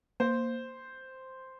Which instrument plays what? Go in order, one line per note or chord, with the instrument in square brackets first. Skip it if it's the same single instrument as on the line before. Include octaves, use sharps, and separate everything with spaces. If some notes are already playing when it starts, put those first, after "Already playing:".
[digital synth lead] A#3 [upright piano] C5